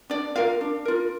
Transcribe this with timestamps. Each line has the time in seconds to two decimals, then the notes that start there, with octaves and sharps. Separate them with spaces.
0.10 D4 D5
0.36 F4 A#4 F5
0.61 D4
0.85 F4 A#4